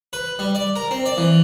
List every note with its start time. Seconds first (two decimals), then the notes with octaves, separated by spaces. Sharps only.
0.13 B4
0.39 G3
0.55 D5
0.76 A#4
0.91 C4
1.06 D5
1.17 E3